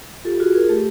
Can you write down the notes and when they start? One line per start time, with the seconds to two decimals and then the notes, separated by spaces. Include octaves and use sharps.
0.25 F4 G4 A4
0.40 F4 F#4 G#4
0.55 F4 G#4 A#4
0.69 A3 G4 A4